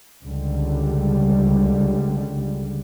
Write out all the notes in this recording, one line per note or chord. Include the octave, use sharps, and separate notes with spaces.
C#2 D3 G3